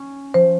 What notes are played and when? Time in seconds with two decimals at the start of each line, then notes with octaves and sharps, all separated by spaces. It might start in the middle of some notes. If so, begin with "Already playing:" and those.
Already playing: C#4
0.34 F3 C5